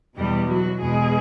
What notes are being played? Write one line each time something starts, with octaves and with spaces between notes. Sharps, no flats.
E2 B2 G3 G4
F#3 F#4
E2 B2 G#3 G#4